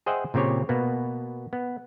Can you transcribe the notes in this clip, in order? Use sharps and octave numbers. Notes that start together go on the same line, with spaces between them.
G#4 C5 D#5 E5 F#5 G5
A#2 C#3 C4 G4 C#5
B2 A#3 B3
B3